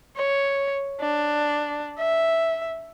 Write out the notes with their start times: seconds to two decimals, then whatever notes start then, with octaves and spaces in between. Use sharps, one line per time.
0.16 C#5
1.00 D4
1.99 E5